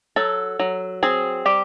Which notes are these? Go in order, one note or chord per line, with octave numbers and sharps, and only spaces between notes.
F#3 A4
F#3
C4 G#4
G3 G4